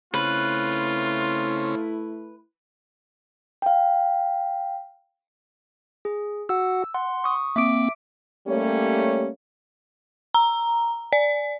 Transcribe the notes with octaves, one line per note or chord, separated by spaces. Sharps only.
C#3 A3 C4 C#4 E4 F4 B4
F5 G5
G#4
F#4 F#5 E6
F#5 C6
C#6 D#6
A#3 C4 E5 D6 D7
G3 A3 A#3 C#4 G4 C#5
A#5
D5